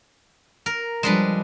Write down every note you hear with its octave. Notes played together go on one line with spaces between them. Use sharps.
A#4
F3 G3 G#3 D4 B4